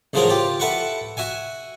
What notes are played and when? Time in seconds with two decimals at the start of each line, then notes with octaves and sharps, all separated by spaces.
0.13 A1 C#3 F3 F#3 G#4 A#4
0.29 F4 G4
0.60 E4 A4 B4 F#5 C#6
1.17 F#4 E5 G#5